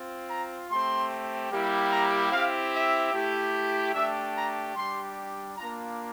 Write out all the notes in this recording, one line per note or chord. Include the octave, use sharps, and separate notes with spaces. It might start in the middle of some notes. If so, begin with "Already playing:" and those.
Already playing: C4 F4
A#5
A3 C4 G4 C6
G3 A#3 E4 G4
A#5
C4 E4 G4 F5
E5
A3 E4 G4
A3 D4 G4 E5
A#5
G3 D4 G4 C6
A#3 D4 F4 A#5